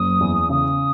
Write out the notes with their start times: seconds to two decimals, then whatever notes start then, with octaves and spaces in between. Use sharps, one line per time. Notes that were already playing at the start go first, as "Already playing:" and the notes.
Already playing: F#1 D#6
0.21 E2
0.50 C#3 D#6